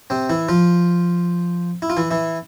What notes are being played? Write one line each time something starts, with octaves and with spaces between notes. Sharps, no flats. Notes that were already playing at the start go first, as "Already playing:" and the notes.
C3 C4
E3 E4
F3 F4
E4
F4
E3 E4
E3 E4